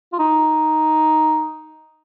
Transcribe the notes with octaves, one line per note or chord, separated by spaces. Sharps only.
F4
D#4